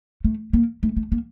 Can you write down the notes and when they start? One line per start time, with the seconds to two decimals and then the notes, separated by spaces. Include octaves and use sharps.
0.24 A3
0.53 A#3
0.83 A3
0.97 A3
1.12 A#3